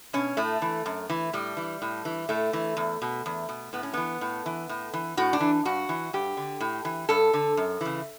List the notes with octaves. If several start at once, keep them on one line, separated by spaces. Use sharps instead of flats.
B2 C#4
A2 A3
E3
F#2
E3
A2 G3
E3
A2
E3
A2 A3
E3
E2
B2
E2
B2
A2 B3
C#4
E3 B3
A2
E3
A2
E3
A2 F#4
D4
E3
G2 F#4
E3
G2 G4
D3
A2
E3
G2 A4
D3
F#2
C#3 E3